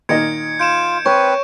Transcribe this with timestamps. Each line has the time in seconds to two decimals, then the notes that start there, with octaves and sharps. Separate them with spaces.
0.09 A#2 D#3 D#5 G#6 C#7 D7
0.59 F4 G6 D7 E7
1.06 C4 B4 C#5 C#6